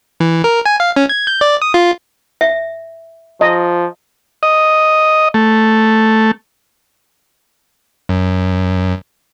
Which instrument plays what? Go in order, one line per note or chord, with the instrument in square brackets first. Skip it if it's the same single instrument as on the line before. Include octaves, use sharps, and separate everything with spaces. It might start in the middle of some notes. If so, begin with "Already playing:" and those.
[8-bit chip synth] E3
A#4
G#5
F5
C#4
G#6
G6
D5
D#6
F4
[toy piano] E5
[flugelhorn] F3 [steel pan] D#5
[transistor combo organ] D#5
A3
[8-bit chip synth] F#2